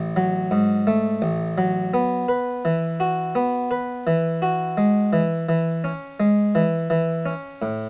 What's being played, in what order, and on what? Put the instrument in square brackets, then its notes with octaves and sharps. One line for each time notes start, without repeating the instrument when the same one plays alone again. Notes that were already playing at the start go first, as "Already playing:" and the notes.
Already playing: [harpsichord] A1
F#3
G#2
A3
A1
F#3
B3
B4
E3
F#4
B3
B4
E3
F#4
G#3
E3
E3
C#4
G#3
E3
E3
C#4
A2